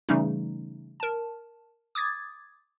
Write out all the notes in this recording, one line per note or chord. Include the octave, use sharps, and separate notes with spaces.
C#3 E3 G3 A3 C#4 D#4
A#4 A5
D6 D#6 G#6 A6